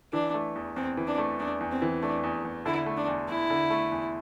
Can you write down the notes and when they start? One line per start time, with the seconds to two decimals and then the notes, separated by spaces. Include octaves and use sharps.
0.13 E3 D4
0.34 A3
0.56 E2
0.76 E2 C4
0.97 E3
1.07 D4
1.18 A3
1.40 E2 D4
1.61 E2
1.71 C4
1.82 E3
2.02 A3 D4
2.23 E2
2.45 E2
2.66 D3 E4
2.86 A3
2.97 D4
3.08 E2
3.28 E2 E4
3.50 D3
3.70 A3
3.92 E2